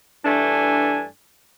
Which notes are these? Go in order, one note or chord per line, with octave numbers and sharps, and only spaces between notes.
G2 E3 A3 D4 G#5